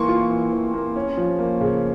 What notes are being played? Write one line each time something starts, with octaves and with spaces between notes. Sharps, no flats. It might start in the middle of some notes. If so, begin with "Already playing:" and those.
Already playing: E3 A#3 C6 C#6
F4
E3
E3
A#3
C#4
F3
A#3
C#3